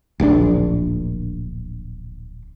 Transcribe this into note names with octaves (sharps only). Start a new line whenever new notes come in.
D1 A#1 C3 D4